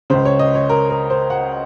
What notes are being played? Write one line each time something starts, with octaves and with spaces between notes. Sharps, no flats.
C#2 C#3 C5
C#5
D#5
C#5
A#4
A#4
C5
F#5